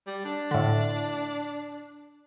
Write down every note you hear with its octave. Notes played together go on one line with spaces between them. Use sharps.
G3
D4
A2 D3